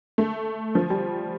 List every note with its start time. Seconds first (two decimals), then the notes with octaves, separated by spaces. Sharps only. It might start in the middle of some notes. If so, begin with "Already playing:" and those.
0.18 A3
0.75 F3
0.90 G3